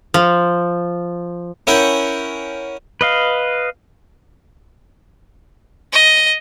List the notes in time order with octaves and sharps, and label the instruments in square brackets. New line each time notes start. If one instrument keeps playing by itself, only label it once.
[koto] F3
[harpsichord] C#4 E4 A#4 F#5 G5
[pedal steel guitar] B4 D#5 F5
[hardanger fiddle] D#5